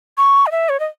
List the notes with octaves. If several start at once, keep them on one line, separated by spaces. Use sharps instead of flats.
C#6
D#5
E5
C#5
D#5